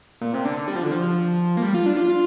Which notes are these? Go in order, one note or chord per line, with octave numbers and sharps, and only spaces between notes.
A#2
C3
D3
D3
G3
F3
D3
F3
A#3
G3
F4
D4
F4
F4